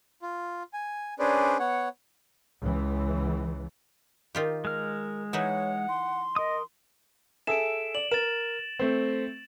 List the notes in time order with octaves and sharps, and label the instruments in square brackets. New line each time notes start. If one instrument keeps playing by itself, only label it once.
[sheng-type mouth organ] F4
G#5
C#4 D4 G#4 B4 C5 D5
B3 C#5 F#5
[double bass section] C#2 E3
[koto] D#3 F4 G4
[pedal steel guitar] G#3 F6 [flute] A#4
[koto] E3 D#4 E4 [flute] C#5 [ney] F#5
[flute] C6
[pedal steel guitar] A#4 D#6 [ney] D#5
[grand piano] G#4 A4 E5 [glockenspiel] D7 E7
[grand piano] D5 [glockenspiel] F#7
[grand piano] A#4 [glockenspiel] A6 E7
[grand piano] A3 C4